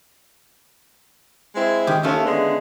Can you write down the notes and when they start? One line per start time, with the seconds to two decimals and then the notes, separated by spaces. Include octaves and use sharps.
1.56 G#3 C4 E4
1.87 D#3 G4
2.03 D#2 A3 C#4 F4 E5
2.26 D3 G#3 B3